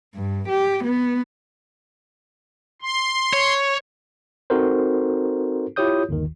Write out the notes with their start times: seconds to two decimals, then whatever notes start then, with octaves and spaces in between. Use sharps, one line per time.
0.15 G2
0.49 G4
0.84 B3
2.82 C6
3.33 C#5
4.50 C4 D#4 F#4 A4 A#4 C5
5.76 E4 F4 G4 C#5 D#6 G6
6.09 G1 D#2 D#3